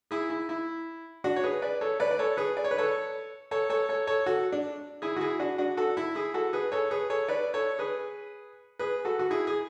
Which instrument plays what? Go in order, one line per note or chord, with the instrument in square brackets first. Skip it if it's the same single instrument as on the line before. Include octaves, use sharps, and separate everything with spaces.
[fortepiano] E4 G#4
E4
E4
D4 F#4
C#5
G#4 B4
B4 D5
A4 C#5
B4 D5
D5
A4 C#5
G#4 B4
D5
C#5
B4
A4 C#5
A4 C#5
A4 C#5
A4 C#5
A4 C#5
F#4 A4
D4
E4 G#4
F#4
E4 G#4
D4 F#4
D4 F#4
F#4 A4
E4
E4 G#4
F#4 A4
G#4 B4
A4 C#5
G#4 B4
A4 C#5
B4 D5
A4 C#5
G#4 B4
G#4 B4
F#4 A4
F#4
E4 G#4
G#4